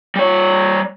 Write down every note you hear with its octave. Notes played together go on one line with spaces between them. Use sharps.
G3 C#5